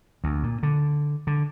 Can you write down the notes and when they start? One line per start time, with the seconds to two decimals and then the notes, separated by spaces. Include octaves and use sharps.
0.24 D2
0.43 A#2
0.63 D3
1.27 D3